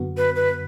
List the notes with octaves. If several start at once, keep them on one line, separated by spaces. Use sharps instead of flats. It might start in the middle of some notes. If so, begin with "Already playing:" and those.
Already playing: F#2 D3 B3 F#4
B4
B4